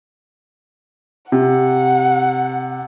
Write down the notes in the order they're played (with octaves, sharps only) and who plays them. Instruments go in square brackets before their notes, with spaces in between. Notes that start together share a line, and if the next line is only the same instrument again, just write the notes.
[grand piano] C3 [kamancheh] F#5